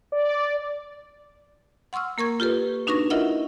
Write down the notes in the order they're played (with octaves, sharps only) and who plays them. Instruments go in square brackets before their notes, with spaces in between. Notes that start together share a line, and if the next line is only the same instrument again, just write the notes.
[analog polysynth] D5
[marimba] F#5 C6 C#6 E6 F6
A#3 A#4 C#6 G#6
F4 G4 A4 B4
D4 D#4 F#4 B4 C#6 A#6
E4 F4 A#4 D#5 E5 F#5